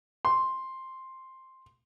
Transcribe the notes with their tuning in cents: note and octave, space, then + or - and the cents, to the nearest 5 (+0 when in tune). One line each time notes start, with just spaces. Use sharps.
C6 +5